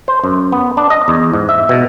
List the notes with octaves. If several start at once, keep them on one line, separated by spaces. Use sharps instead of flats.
C5
F#2
B3
D4
D#5
E2
G#2
E5
B2